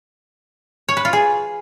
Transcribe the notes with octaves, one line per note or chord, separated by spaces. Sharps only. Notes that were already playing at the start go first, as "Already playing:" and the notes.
C#5
B4
F4
G#4